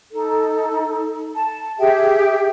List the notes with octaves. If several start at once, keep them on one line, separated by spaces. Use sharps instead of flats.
D#4 A4
A5
G4 G#4 E5 G5